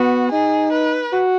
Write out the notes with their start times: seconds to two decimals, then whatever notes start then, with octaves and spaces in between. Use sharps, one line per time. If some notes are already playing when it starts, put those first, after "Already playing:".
Already playing: B3 F#4
0.32 D#4 G#4
0.72 B4
1.12 F#4